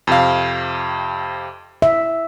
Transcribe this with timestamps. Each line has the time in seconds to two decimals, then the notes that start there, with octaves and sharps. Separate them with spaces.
0.07 F2 C3 F5
1.82 E5